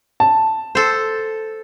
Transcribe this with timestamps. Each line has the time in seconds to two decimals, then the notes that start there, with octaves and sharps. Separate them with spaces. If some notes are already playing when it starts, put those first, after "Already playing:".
0.20 A5
0.75 A4 C5